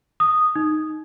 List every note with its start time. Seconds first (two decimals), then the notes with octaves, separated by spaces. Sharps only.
0.20 D#6
0.56 D#4